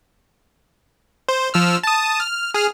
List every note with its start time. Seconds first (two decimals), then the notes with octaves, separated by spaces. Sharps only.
1.29 C5
1.54 F3 E6 F6
1.84 A5 D#6
2.20 F6
2.54 G#4 F6